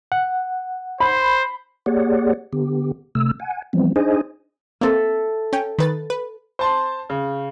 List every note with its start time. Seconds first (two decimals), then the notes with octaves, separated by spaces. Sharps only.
0.12 F#5
1.00 C5 B5
1.86 A#3 G4 G#4 C#5 D5 F#5
2.53 D3 B3 G4
3.15 C3 A3 E6
3.40 F#5 G#5
3.73 E3 F3 G3 B3 C4
3.96 D4 D#4 G#4 C5 D#5 G#5
4.81 A#3 C4 A4 E5 E6
5.53 C#4 G5
5.79 D#3 B4 A6
6.10 B4
6.59 C5 A5 C6
7.10 C#3